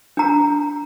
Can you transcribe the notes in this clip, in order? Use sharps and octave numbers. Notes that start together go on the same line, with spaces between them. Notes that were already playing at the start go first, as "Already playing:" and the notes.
D4 A#5